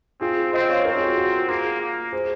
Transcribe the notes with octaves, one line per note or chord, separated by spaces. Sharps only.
C4 F4 G#4
C4 C5 D#5
C#5 F5
C4 A#4 C#5
F4 G#4
F#4
F#4
A#3 F4 G#4
A#3
G#4 C5